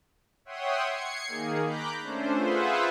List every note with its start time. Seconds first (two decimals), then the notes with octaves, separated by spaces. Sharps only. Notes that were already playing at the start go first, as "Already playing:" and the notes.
0.45 C#5 E5 F#5 G5 C6 D#6
0.86 G#6 C7 C#7
1.27 D#3 A#3 G#4
1.63 A#5 B5 D6 F#6 G6
2.01 A3 C#4 D4 C5
2.34 F4 G#4 B4 C5 E5 F#5